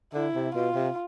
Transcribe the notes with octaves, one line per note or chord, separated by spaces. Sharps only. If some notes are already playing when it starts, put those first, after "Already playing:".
D3 E4
C3
B2 F4
C3